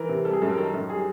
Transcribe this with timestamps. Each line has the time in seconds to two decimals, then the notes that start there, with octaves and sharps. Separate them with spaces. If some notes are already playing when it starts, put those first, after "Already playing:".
Already playing: E3 A#4
0.09 C3
0.25 G3 A4
0.33 G#4
0.42 F#2 A4
0.49 A#4
0.57 D#3 A4
0.74 F#2
0.79 A4
0.90 G3 G#4